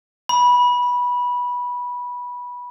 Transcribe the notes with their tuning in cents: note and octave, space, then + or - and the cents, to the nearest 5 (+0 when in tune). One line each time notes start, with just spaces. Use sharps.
B5 -15